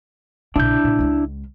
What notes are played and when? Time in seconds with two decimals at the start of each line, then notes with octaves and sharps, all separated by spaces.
0.56 A#1 C#3 D4 E4 G6
0.84 A#2 C#3
0.98 C#2 G#3